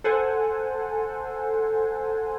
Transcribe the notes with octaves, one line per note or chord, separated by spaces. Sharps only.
A4 C5 F#5 G#5